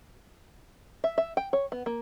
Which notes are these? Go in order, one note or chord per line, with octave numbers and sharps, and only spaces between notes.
E5
E5
G5
C#5
B3
A#3